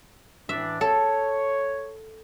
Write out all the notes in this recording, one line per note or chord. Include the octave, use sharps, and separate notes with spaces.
A2 E3 D4 E5
A4 C#5